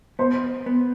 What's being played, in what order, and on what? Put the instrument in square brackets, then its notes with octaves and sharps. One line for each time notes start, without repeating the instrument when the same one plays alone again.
[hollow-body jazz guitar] B3 [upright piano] C5
[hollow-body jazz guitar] B3